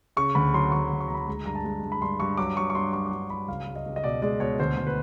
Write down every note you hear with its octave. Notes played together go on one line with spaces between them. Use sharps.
C#3 C#6
D2 B5
F#3 C6
D2 C#6
D2
C#6
D2 A#5
B5
G#3 A#5
G2 A#5
A5
G#3
G2
B5
G2 C6
G2 C#6
F#3 D6
F#3 C#6
C#6
G2 C6
F#3 C#6
D6
G2 C#6
F#3 B5
C#2 F5
C#2
D#5
C#2
D#5
B2 D5
G#3 D5
B2 C#5
D2 C5
D2
B4